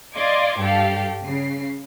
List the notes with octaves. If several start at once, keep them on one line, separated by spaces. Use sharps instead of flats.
D5 D#5 F5 C6 D6 G#6
G2 G4 A4 F5
C#3 C7